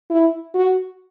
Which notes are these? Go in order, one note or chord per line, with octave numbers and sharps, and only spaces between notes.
E4
F#4